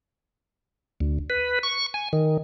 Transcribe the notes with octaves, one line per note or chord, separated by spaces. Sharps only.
D2
B4
C#6
G#5
D#3